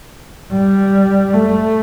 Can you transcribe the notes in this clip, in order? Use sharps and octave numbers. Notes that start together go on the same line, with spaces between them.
G3
A3